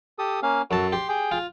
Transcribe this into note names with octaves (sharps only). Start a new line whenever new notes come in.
G4 A4 D#6
A#3 C#4 F5
F#2 F#4 A4 A5
G4 C6
G#4 G5
F4